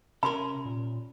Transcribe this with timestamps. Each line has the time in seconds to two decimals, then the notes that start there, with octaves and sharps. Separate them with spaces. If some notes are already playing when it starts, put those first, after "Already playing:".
0.23 C3 C#4 A#4 B5 C6
0.65 A#2